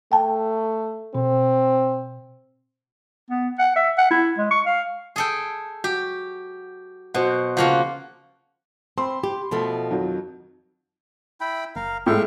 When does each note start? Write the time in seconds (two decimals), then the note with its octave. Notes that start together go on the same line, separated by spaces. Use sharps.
0.12 A3 G5 A5
1.15 B2 C4
3.30 B3
3.59 F#5
3.76 E5
3.98 F#5
4.11 E4
4.38 G#3
4.51 C#6
4.66 F5
5.16 G#4 A4 G5
5.84 F#4 G4
7.14 B2 F#4 C5 F#5
7.57 C#3 F3 A#3 F4 F#4 F#5
8.98 C4 B5 C6
9.24 G4
9.51 B2 F3 A3
9.90 F2 D#3 F#3
11.41 E4 G5 B5
11.76 F#1 A#4 F5
12.06 A2 G#3 F5 G5 C#6